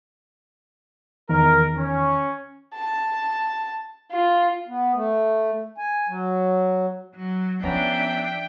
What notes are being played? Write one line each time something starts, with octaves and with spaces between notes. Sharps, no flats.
E2 D#3 A#4
C#4
A5
F4
B3
A3
G#5
F#3
F#3
F3 B3 C#4 D4 E5 G5 A#5